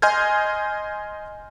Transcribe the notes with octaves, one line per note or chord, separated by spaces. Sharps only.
D#5 G#5 C6 F6 G6 G#6